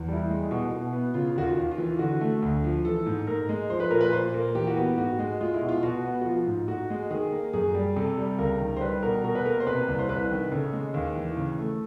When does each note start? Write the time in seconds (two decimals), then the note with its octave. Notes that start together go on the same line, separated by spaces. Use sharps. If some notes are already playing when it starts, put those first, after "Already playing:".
Already playing: E2
0.08 G3 E4
0.29 G#3
0.51 B2
0.71 B2
0.93 B3
1.14 C#3 F4
1.36 D#2 F#4
1.43 F4
1.57 D#2
1.71 F4
1.78 E3
1.99 D3 F#4
2.21 A3
2.42 D2
2.64 F3
2.85 E3 A4
3.06 G#2
3.27 G#2 A#4
3.49 G#3
3.70 F3 C5
3.80 B4
3.91 A#2 A#4
4.01 B4
4.13 A#2 C5
4.34 A#3
4.55 E3 G4
4.67 F#4
4.76 B3 G4
4.98 G#2 F#4
5.19 G#3
5.41 G#3 F4
5.54 E4
5.61 B2
5.69 F4
5.83 B2 F#4
6.05 B3
6.21 F#4
6.25 F3 F4
6.47 G#2
6.68 G#2 F#4
6.90 G#3
7.10 D#3 G#4
7.32 A#3
7.53 F#2 G#4
7.75 G3
7.96 C3 A4
8.18 G3
8.39 C#2 A#4
8.60 D#3
8.77 C5
8.81 G3 B4
9.03 B2 A#4
9.24 B2 A#4
9.35 B4
9.45 A#3 A#4
9.60 C5
9.67 C3 B4
9.88 C2
9.99 C5
10.09 C2 B4
10.30 D#3
10.51 C#3 A4
10.73 G#3
10.94 D#2
11.16 E3
11.37 C#3
11.58 A3